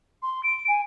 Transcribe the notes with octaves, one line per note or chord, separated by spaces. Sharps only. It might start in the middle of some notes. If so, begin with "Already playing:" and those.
C6
D7
G#5